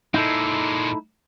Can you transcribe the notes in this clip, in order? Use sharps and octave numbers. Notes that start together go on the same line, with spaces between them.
A#2 G#3 D#4 E4 A4